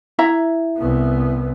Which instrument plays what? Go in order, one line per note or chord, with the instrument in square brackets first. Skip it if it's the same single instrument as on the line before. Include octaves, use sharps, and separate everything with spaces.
[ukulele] E4 E5 A#5
[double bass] C2 B3